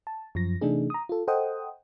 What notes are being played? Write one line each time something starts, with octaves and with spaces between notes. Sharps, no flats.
A5
F#2 F3 A#6
C3 E3 A3 D4 D#4 G#4
A#5 D#6
F4 A4
A4 C5 D#5 F#5 G5 D#6